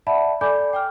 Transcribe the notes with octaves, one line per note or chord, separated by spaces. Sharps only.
D5 E5 F#5 A5 B5
A4 D5 G#5 B5 D6 G6
G5 D6 F6